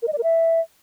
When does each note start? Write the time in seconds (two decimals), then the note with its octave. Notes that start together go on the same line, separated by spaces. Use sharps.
0.02 A#4
0.08 D#5
0.13 D5
0.18 A#4
0.23 E5